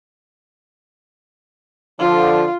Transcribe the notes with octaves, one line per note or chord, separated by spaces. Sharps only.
D3 F3 F4